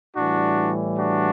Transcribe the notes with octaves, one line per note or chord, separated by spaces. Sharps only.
A2 E3 G3 D4 F#4
D4 F#4